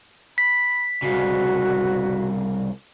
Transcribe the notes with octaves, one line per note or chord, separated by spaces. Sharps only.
B5 B6
C2 C#3 F#4